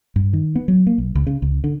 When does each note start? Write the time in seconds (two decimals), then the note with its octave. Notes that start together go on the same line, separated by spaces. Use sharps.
0.16 G2
0.33 D#3
0.56 B3
0.68 F#3
0.87 A#3
0.98 B1
1.15 C#2
1.27 C#3
1.42 C#2
1.64 D3